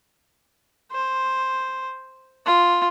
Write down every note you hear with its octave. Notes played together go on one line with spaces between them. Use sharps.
C5
F4